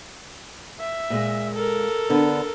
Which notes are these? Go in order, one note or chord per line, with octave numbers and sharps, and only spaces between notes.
E5
A#2 G#3
A4 A#4
D3 B3 D4